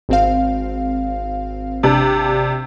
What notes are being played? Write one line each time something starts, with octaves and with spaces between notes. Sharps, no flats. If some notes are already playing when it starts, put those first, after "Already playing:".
G#1 C4 F5
C3 D4